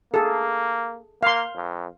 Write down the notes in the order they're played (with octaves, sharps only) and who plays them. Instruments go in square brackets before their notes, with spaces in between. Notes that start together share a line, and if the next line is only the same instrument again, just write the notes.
[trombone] A#3 [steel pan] G#4 A4
[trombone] A#3 [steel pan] F5 C6
[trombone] F2